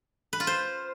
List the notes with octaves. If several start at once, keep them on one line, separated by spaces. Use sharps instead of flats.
B4
F4
C5